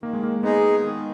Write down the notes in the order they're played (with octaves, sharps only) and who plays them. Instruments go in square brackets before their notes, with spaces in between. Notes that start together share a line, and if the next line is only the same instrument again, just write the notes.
[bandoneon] D#3 [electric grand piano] A#3
[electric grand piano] G#3
A#3
[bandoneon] G#3 D#4 G#4 [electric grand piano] B3
[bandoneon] D#3